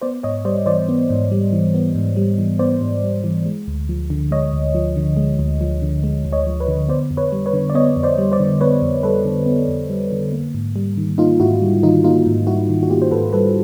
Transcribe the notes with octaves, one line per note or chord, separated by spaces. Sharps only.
B3 C5 D5
G#2 C#5 D#5
G3 C5 D5
E3 C5 D5
B3
G#2
G3
E3
B3
G#2
G3
E3
B3 C5 D5
G#2
G3
E3
G#3
D2
F3
D3
G#3 C#5 D#5
D2
F3
D3
G#3
D2
F3
D3
G#3
D2
C#5 D#5
F3
B4 C#5
D3
B3 C5 D5
F2
B4 C#5
G3
B4 C#5
D3
D5
B3 C#5 D#5
F2
C5 D5
G3
C5 D5
D3
B3 B4 C#5
F2
G3 A4 B4
D3
B3
F2
G3
D3
A#3
G#2
G3
D#3
A#3 D#4 F4
G#2 E4 F#4
G3
D#3 D#4 F4
A#3 D#4 F4
G#2
G3 E4 F#4
D#3
F#4
A#3 F4 G4
C5
G#2 A4 B4
G3 A4 B4